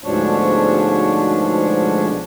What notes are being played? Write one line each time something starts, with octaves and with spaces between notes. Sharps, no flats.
D2 G#2 B2 F3 D4 C#5